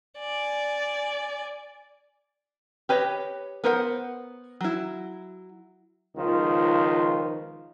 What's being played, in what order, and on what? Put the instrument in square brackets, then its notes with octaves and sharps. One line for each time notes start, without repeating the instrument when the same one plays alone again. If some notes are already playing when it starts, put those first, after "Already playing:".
[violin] D5 G#5
[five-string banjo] G4 B4 C#5 D#5
B3 A#4 C5 F#5
F#3 E4
[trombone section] C#2 D#3 F3 F4